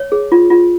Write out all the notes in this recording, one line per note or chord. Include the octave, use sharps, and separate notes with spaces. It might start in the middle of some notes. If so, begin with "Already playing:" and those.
Already playing: C#5
G#4
F4
F4